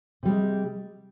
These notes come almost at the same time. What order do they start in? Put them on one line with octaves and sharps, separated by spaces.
C3 G3 G#3